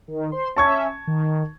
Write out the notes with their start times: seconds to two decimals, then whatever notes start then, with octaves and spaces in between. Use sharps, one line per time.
0.08 D#3
0.32 C5 C6
0.57 C#4 E5 A5 C#6 G#6
1.07 D#3